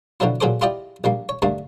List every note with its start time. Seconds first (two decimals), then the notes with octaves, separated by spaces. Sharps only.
0.20 B2 D3 F3 F#3 E4
0.41 A#2 F#3 G#4 A4 C5 D6
0.61 E4 F4 G4 D5 D#5 G5
1.04 A#1 G3 A#3
1.29 C#5
1.42 G2 D3 A3 A#3